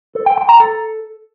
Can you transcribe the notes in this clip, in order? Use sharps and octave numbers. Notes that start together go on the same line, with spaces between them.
A4
G5
G5
A#5
A4